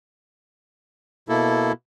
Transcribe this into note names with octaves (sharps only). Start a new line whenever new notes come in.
B2 A#3 E4 A4